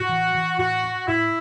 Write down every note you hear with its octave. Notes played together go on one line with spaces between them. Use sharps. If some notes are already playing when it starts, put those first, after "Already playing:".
Already playing: A2 F#4
E3
E3
A2 F#4
C#4
A2 E4